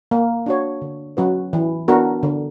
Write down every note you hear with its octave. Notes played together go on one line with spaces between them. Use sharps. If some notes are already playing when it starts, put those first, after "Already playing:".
A#3
D4 F#4 C#5
D3
F#3 C#4 F#4 B4
E3
B3 D4 F#4 A#4
D3